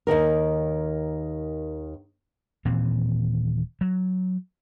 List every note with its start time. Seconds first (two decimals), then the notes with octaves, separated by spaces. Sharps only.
0.07 D#2 B2 D#3 A#4
2.65 D#1 A#2 E3 C4
3.81 F#3